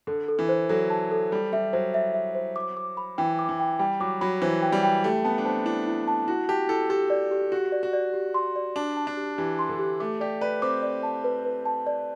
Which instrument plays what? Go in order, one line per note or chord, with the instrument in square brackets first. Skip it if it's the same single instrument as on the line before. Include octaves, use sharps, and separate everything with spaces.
[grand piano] D3 [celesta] A4
[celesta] A4
[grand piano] E3
[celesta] C5
[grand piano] F#3 [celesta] A4
[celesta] A5
A4
[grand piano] G3 [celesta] A4
[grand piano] G3 [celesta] E5
[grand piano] F#3 [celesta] C5
[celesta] E5
E5
C5
D6
D6
B5
[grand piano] E3 [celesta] G5
[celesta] D6
[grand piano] E3
[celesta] G5
[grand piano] G3 [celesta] G5
[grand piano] F#3 [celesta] D6
[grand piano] F#3 [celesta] B5
[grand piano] E3 [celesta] C5
[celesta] G5
[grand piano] G3
[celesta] G5
[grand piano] A3 [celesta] G4
[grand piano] B3 [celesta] A5
[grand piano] D4
[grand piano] C4 [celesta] A5
[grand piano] D4 [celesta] E4
[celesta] E4
A5
[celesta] E4 [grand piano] F#4
[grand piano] G4 [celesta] A5
[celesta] E4 [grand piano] A4
[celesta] G4 [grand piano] A4
[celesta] D5
G4
[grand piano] F#4 [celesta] G4
[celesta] D5
[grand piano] F#4
[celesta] D5
G4
C6
D5
[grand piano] D4 [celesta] A5
[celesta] A5
[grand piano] D4
[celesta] G4
[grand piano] E3 [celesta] G4
[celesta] C6
[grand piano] D3
[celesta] G4
[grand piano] A3 [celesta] D6
[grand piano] G4 [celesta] D5
[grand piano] B4 [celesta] D5
[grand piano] C4 [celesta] D6
[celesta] D5
A5
B4
B4
A5
D5